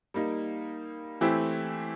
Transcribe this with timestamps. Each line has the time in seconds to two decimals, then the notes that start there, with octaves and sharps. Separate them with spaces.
0.14 G3 A#3 D#4
1.21 E3 A3 C4 E4 G4